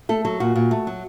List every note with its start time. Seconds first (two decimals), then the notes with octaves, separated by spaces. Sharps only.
0.09 A3 A4
0.25 F#3 A4
0.40 A#2 F#4
0.56 A#2
0.71 A3
0.87 F#3